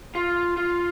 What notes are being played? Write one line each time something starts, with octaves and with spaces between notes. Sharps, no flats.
F4
F4